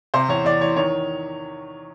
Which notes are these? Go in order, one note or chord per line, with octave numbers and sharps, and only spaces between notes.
C3 C5
E2 C#5
E2 D5
E3 C#5
D#3 C#5